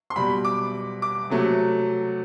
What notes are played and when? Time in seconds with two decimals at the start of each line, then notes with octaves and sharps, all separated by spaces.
0.10 C6
0.16 B2 G3 B5
0.45 D6
1.02 D6
1.30 C3 F#3 A3